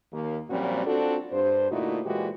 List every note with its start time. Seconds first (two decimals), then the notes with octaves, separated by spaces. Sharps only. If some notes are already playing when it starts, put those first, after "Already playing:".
0.12 D#2 A#3
0.50 F#2 A#2 F3 G3 C4 F#4
0.86 C4 D4 F4 F#4 A4
1.32 G2 C5
1.71 A#2 D3 A3 D#4 E4 F#4
2.05 A#2 E3 G#3 F#4 G4